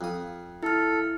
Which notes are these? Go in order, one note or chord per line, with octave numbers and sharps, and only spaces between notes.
F2 D#6
E4 A4 F6